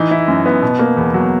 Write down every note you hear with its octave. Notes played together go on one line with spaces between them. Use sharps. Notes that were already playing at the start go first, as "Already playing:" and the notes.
Already playing: E3 D#4
E4
F#2
B3
B2
A#3
E2
F#3